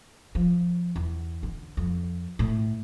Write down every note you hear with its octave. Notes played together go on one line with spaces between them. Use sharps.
F3
E2
D3
F2
A2